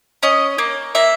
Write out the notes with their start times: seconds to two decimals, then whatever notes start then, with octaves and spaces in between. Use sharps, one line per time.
0.23 C#4 D#5
0.58 A#3
0.95 A#3 E5